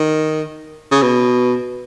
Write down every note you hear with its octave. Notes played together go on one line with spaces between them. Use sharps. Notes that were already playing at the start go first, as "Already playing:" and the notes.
Already playing: D#3
C#3
B2